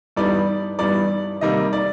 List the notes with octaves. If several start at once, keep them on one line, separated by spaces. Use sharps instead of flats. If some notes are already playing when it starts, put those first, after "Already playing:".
G2 E3 G3 B3 D#4 D5
G2 E3 G3 B3 D#4 D5
C3 D#3 G3 A#3 D#4 D#5
D5